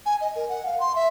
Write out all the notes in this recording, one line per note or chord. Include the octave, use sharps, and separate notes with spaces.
G#5
D#5
A#4
F#5
F5
C6
E5